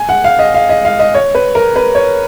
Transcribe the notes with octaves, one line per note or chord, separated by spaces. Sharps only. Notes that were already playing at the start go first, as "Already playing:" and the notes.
Already playing: G#5
F#5
F5
D#5
F5
D#5
F5
D#5
C#5
B4
A#4
B4
C#5